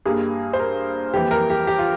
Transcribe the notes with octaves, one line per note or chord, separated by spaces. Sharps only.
G2 G3 A#3 G#4
C5
A#4
F2 E3 G3 A#3 G4
A#4
G4
G4
F4